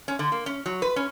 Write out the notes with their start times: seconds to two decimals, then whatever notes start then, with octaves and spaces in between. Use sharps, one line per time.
0.08 C#4
0.19 D3
0.32 A#3
0.46 C#4
0.66 F#3
0.82 B4
0.96 C#4